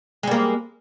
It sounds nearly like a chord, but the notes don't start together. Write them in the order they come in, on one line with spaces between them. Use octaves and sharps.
G#3 G3 A#3